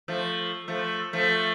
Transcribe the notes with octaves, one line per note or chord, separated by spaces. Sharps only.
F3 A3
F3 A3
F3 A3